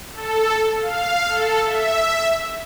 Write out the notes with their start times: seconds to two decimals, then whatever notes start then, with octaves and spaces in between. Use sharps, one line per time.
0.13 A4
0.81 F5
1.29 A4
1.64 E5